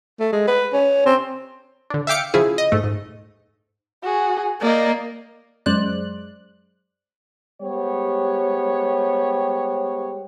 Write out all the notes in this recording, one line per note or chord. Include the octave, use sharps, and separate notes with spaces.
A3
G#3
B4
C#4
C4
D3 D4
E5 F5 G5 D6 C#7
C#3 F3 E4 G#4
D#5
G#2 A3
G#2
F#4 G#4
A#3 D5 D#5
F#2 G#3 C5 D5 F#6
G3 G#3 B3 G4 C5 C#5